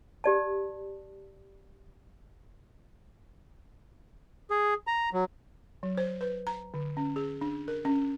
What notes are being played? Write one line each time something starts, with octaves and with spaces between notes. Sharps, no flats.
G4 D5 A5
G#4
A#5
F#3
F#3
C5
B4
A#5
D3
C#4
G#4
D4
A#4
C#4